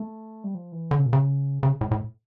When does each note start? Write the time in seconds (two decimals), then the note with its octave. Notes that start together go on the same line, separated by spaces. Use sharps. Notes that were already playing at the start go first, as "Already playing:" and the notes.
Already playing: A3
0.44 G3
0.55 F3
0.72 E3
0.91 D3
0.99 C#3
1.06 A#2
1.13 C#3
1.63 C#3
1.81 A2
1.91 A2